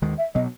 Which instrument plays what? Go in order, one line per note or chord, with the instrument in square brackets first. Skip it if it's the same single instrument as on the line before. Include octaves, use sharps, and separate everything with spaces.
[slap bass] D#2 D#3 G#3
[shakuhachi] E5
[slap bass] B2 F#3 [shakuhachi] D#5